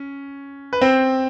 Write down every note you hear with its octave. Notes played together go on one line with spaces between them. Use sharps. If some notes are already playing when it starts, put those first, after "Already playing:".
Already playing: C#4
B4
C4 C5